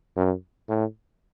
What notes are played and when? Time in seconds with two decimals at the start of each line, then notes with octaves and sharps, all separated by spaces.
0.16 F#2
0.69 A2